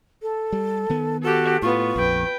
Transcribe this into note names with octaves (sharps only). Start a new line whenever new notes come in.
A4
G3
D#3 B3
F#4 G4 A4
A2 B3 F4 C#6
A#1 F2 B4 G5